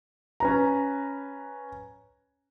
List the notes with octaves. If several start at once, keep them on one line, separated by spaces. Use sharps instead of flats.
C#4 B4 A#5